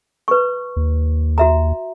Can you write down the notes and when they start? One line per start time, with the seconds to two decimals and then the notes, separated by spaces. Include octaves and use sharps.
0.28 B4 C#6
0.76 D#2
1.38 F#4 E5 A#5